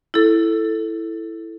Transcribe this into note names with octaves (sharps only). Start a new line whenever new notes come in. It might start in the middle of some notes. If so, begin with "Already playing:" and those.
E4 A4